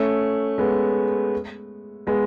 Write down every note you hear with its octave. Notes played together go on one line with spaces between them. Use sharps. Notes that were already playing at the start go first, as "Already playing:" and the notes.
Already playing: A3 C#4
G#3 B3
G#3 B3